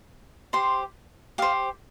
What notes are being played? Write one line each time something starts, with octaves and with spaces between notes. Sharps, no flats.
G4 C5 C6
G4 C5 F5